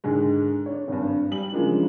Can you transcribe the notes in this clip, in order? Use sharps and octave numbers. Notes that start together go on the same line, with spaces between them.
G#2 D3 D#3 G#3
D4 C#5
G#1 G2
G3 F#7
C#3 E3 F3 G#3 A#3 D4